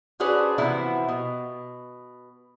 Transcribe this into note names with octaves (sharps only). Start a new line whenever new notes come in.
C#4 D4 F#4 G#4 B4 C5
C3 E3 F3 B3 E4 F#4
B2